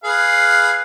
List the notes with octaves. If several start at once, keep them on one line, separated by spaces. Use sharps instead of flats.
G#4 B4 F5